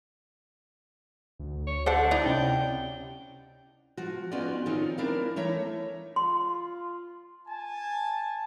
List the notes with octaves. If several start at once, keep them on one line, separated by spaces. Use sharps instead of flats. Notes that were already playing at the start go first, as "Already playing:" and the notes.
D2
C#5
D3 D4 A4 C5 F#5
D#4 E4 D5
C3 C#4 G5
F3 F#4
B3 C#4 D#4 F4 F#4 D5
D#3 F3 C4 C#4 D#4 F4
D4 E4 A#4 D5 F5
E3 A3 C#5 E5 A#5
F4 C6
G#5 A5